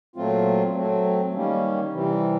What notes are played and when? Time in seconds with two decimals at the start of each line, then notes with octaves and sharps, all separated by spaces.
0.16 A#2 F#3 A3 C4 F4
0.75 F#3 A3 C4
1.33 D#3 G3 A#3 C#4
1.92 C3 E3 G3 C4